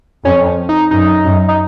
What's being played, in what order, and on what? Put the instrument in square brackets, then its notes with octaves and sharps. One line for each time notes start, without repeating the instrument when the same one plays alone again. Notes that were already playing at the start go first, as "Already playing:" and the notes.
[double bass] F2 [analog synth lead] C#4
[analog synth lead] D#4
[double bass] F#2 [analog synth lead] D#4
[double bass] F#2
[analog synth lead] D#4